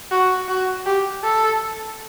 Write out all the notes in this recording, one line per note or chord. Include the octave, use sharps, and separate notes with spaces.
F#4
F#4
G4
A4